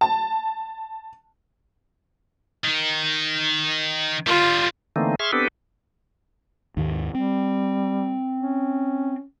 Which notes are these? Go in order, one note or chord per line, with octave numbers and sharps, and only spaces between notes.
A5
D#3 D#4
D3 G3 F4
D3 E3 A3 A#3 C4 D#4
G#4 E5 C6 C#6 F6
B3 C4 D4 G4 A4 B4
D#2 G#2 D#3
G3 C4
C#4